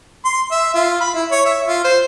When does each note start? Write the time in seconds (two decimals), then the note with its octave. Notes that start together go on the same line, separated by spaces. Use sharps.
0.25 C6
0.52 E5
0.75 F4
1.01 B5
1.15 E4
1.31 C#5
1.45 E5
1.68 F4
1.85 C5